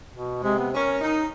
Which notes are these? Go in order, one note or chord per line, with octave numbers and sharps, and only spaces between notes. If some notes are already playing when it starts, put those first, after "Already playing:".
B2
C3 G#3
B3
C#4 A#4
D#4